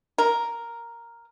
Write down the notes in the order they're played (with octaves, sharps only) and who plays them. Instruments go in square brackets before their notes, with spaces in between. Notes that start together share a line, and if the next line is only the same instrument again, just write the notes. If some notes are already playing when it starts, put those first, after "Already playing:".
[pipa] A#4